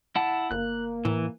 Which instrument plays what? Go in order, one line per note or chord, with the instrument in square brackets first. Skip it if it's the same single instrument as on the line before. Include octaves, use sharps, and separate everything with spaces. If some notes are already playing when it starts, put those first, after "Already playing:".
[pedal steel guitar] E4 F#5 A5
[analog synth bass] G1 [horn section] A#3 [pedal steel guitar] F#6
[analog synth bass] A2 [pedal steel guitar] E3